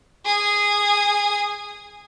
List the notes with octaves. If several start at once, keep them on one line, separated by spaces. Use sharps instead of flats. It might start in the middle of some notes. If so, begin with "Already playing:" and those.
G#4 D#6